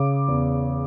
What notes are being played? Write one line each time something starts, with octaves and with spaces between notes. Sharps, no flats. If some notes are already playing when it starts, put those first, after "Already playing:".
Already playing: C#3 D6
E2